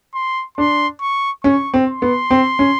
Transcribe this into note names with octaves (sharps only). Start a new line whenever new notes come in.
C6
D4 C6
C#6
C#4 C#6
C4
C6
B3
C4
C#4